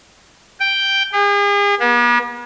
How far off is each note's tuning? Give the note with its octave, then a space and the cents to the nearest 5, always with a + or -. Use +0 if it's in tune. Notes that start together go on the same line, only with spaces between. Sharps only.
G5 +0
G#4 -40
B3 -45